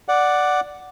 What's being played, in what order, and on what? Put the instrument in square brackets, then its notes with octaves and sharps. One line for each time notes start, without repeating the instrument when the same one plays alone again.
[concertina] D5 F#5